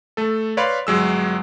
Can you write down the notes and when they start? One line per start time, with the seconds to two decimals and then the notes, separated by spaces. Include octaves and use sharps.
0.17 A3 A4
0.57 B4 C#5 D5 F5 B5 C6
0.87 G1 F#3 G#3 E6